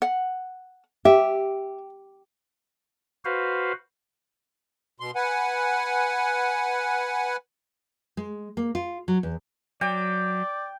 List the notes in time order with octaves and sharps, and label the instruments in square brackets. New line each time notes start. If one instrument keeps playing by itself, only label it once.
[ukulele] F#5
[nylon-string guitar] G4 [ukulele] E5
[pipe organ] F#4 B4 C5 F5
[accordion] B2 C6
B4 F#5 G#5
[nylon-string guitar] G#3
A#3
F4
F#3
E2
[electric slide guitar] F#3 [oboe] D5 [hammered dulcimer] G5